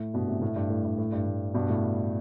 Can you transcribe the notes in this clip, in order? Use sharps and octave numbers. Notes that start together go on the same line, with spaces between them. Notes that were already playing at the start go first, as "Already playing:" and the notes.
Already playing: A2
G2 B2
A2 C3
A2
G2
A2
G2
A2
G2
A2
G2 B2
A2